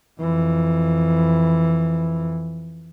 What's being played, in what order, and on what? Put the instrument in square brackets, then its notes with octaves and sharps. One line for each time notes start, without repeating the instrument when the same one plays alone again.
[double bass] F2 E3